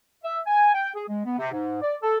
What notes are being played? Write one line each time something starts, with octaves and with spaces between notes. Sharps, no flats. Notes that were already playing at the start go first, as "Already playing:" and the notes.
E5
G#5
G5
G#4
G#3
B3
C3
G#2
D5
A4